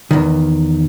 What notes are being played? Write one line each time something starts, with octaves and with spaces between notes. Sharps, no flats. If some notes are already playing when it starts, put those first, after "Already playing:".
E2 D#3